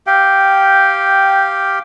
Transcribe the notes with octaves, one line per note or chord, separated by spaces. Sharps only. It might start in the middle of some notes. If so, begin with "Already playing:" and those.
G4 F5 G5